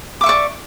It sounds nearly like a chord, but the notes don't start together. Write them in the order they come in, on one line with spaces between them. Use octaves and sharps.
D6 E5 C#6 D5